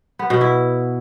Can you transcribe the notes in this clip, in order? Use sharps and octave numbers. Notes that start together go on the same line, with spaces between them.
B3
B2
E4